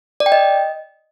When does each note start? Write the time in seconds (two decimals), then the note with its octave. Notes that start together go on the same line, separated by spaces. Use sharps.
0.20 D5
0.26 G5
0.32 D#5